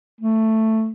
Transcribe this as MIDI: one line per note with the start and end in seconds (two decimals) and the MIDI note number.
0.21 0.92 57